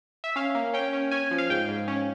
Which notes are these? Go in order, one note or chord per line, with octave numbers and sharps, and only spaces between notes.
E5
C#4 F5
A#3
C#4 G5
C#4
C#4 G#5
F3
F5
G#2 G5
G#2
C#4